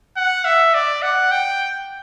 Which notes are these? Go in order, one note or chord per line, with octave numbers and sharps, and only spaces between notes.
F#5
E5
D5
F#5
G5